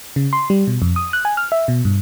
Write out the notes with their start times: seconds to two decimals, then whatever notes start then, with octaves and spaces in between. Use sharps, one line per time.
0.16 C#3
0.33 C6
0.50 G3
0.67 B2
0.82 F2
0.96 D#6
1.13 F#6
1.25 G#5
1.37 F6
1.52 E5
1.68 B2
1.85 G2